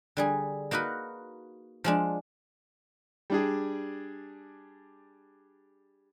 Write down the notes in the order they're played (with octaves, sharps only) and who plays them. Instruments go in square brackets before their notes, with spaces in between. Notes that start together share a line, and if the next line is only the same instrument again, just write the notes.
[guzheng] D3 G3 G#4
A#3 D#4 F#4 A#4 B4
F3 G#3 D4
[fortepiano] G3 D4 G#4